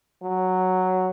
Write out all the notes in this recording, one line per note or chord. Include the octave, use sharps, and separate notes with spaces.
F#3